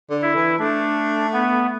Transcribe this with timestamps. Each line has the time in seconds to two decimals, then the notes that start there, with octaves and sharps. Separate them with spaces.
0.10 D3
0.22 E4
0.35 E3
0.59 A3 D4
1.33 B3